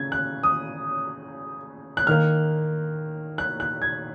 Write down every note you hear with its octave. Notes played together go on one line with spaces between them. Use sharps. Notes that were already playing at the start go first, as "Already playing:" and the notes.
Already playing: C#3 G#6
F#6
D#6
F#6
D#3 A#3 F6
F#6
F#6
G#6